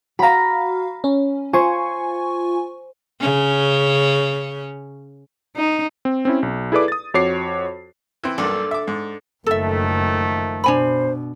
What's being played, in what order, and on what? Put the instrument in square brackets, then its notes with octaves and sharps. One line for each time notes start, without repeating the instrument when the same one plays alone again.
[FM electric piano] F#4 F5 [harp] A#5 B5
[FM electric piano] C#4
[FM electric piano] F4 G#5 C#6 [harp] C5
[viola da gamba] C#3 C#4
D#4
[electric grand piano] C4
C4 C#4 E4
B1
E4 G#4 A4 B4 D5 D6
D#6 A6
F2 F#4 C#5 D6 C7
[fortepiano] E3 C4
[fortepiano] B1 G2 A#3 [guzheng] D4 A4 D5
[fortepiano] E5 D6
G#2
[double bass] F#1 [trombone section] D#3 F3 A3 [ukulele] A4 E5
[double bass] B2 [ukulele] D4 G#5 B5 [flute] C5